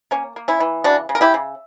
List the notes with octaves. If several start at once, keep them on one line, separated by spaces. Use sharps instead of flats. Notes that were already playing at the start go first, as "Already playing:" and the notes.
A#3 C#4
A#3
C#4 E4
E3
C#3 D4 F#4
C#3
A#4
E4 G4
C#3